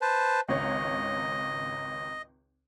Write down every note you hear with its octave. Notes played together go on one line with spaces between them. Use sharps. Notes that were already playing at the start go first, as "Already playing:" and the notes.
B4 C5 A5
G#1 C#2 C#5 D#5